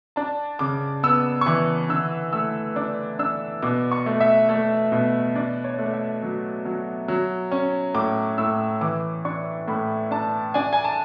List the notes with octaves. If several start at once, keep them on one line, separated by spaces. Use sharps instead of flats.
D4 A5
C#3 D6
B3 E6
C#6
E3 D6
D3 E6
A3 E6
D4 D6
D4 E6
B2 D6
C#6
A3
E5
A3
B2
D4 D5
C#5
A3
E5
F#3
F#3
F#3
C#4
A2 D6
A2 E6
E3 D6
D4 C#6
A2 B5
D4 A5
D4 G#5
G#5
A5